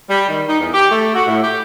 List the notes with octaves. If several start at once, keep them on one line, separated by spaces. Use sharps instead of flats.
G3
D#3
D#4
E2
G4
A3
F#4
A2
G4